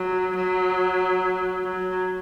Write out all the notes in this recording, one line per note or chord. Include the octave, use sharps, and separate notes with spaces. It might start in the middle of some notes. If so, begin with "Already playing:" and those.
Already playing: F#3
F#3
F#3